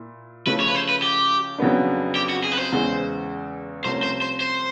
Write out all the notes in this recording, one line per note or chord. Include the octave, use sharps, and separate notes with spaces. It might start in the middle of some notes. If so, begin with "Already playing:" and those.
Already playing: A#2 E4
C#3 F3 A3 C#4 E4 B4
C#5
B4
C5
B4
G4
F2 C#3 F#3 B3 D4
G4
F#4
G#4
B4
C5
E2 C#3 E3 G#3
C2 C3 F3 A3 C#4 C5
C5
C5
C5